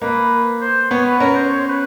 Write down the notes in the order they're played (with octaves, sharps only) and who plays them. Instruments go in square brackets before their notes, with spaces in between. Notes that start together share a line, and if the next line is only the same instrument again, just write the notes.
[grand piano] A#3 [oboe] B4
[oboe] C5
[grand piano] B3 [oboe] C#5
[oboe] B4
[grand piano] C#4 [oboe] A#4
[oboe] C5
C#5
C5
B4